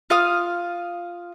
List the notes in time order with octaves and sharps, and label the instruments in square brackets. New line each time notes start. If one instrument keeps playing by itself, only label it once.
[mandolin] F4 F5 D#6 F6